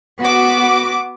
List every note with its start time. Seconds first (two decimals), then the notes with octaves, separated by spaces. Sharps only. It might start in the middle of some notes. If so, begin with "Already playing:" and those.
0.21 B3 F#4 D6